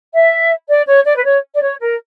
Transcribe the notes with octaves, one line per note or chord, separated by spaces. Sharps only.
E5
D5
C#5
D5
B4
C#5
D5
C#5
A#4